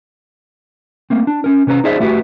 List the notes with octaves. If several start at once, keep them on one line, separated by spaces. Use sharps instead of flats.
A3 A#3 C4
D4
C#4 A#4
C3 C#4 B4 C5 A#5
D#4 E4 G#4 C5 D5 E5
A3 E4 F#4 G4 B4